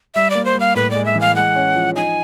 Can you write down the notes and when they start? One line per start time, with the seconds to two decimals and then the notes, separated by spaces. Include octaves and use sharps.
0.15 G3 E5
0.30 A#3 D5
0.45 C5
0.55 G3
0.60 F5
0.75 A2 B4
0.91 G#3 D5
1.06 E5
1.16 E3
1.21 F5
1.36 G#3 F#5
1.55 C#4
1.76 F3
1.95 D#4 G#5